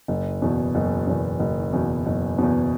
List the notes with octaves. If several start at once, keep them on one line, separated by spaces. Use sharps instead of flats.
F#1
E2 B2
F#1
E2 B2
F#1
E2 B2
F#1
E2 B2